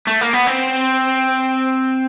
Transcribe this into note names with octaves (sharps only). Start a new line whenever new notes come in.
A3
A#3
B3
C4